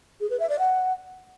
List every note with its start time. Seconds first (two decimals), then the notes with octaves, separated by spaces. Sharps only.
0.21 G#4
0.30 B4
0.40 E5
0.49 D5
0.59 F#5